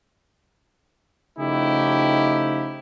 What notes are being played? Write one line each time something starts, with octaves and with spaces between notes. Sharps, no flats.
C#3 F3 A3 D#4 E4 G4